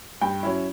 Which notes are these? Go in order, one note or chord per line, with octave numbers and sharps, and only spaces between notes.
G2 G5
F#3 C#4 E4